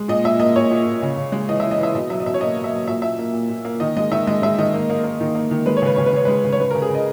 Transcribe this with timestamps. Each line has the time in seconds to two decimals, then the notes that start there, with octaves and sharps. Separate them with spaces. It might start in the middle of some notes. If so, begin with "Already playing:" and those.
Already playing: G#3
0.08 A#2 D#5
0.24 A#2 E5
0.40 A#3 D#5
0.56 A#2 C#5
0.71 A#2
0.86 A#2
1.02 C#3
1.17 C#3
1.32 G#3
1.49 E3 D#5
1.60 E3 E5
1.71 D#5
1.79 E3 E5
1.95 B2 D#5
2.10 F#3 E5
2.20 D#5
2.26 B2 E5
2.34 C#5
2.41 A#3 D#5
2.56 A#3
2.64 E5
2.73 F#3
2.88 A#2 E5
3.02 A#2 E5
3.19 A#3
3.34 A#2
3.49 A#2
3.65 A#3
3.80 D#3 D#5
3.96 G#3 D#5
4.12 D#3 E5
4.27 G#3 D#5
4.42 G#3 E5
4.58 D#3 D#5
4.74 A#3
4.90 A#3
5.04 A#3
5.21 D#3
5.35 A#3
5.51 D#3
5.66 G#3 B4
5.77 C#5
5.82 C#3 B4
5.96 C#3 C#5
6.06 B4
6.13 C#3 C#5
6.25 G#3 B4
6.44 C#3
6.53 C#5
6.60 G#3 B4
6.71 C#3 A#4
6.82 G#4
6.90 C#3 D#5